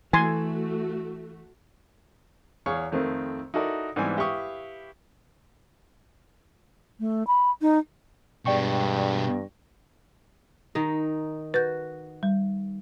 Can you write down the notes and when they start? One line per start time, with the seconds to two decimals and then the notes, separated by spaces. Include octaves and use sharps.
0.13 E3 A3 F#4 G#5 C6
2.66 E2 G#4 C#5 F5 C#6
2.92 F2 D#3 A3 C4
3.54 D#4 E4 F#4 A4 A#4 D5
3.96 G#2 E3 G3 B3 C4 G#5
4.17 E4 G4 B4 F5 C#6 D#6
7.00 A3
7.27 B5
7.61 D#4
8.46 G2 B2 G#3 D5 G5 C#6
10.75 D#3 D#4
11.54 F#4 B4 G6
12.23 G3